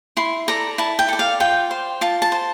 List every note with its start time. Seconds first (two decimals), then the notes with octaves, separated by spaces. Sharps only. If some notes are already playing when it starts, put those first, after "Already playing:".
0.17 E4 C6
0.48 A4 D5 A#5
0.78 E4 A5
0.99 G5
1.09 A4 D5
1.19 F5
1.40 F4 G5
1.71 C5
2.01 F4 A5
2.22 A5
2.32 C5